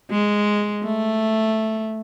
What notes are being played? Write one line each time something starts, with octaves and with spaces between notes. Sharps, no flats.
G#3
A3